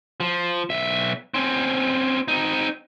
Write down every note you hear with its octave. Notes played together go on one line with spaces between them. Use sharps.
F3
B1 E5
C4 C#4
C4 D#4